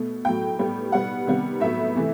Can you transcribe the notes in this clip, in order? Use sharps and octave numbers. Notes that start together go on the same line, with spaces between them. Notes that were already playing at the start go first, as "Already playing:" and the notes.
Already playing: B2 A3
A2 F#3 A3 G5
A2 G3 B3
B2 G3 B3 F#5
C3 D#3 G3 B3
A2 F#3 B3 E5
C3 E3 A3